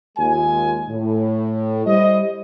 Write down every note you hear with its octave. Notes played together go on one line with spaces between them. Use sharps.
D#2 G#3 F4 G#5
A2
G3 E4 C5 D#5